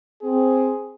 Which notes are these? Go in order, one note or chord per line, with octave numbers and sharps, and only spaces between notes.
C4 G#4